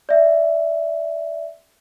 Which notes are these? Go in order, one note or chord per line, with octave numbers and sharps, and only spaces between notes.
D5 E5